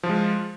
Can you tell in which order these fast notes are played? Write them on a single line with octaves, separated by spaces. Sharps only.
F3 F4 G#3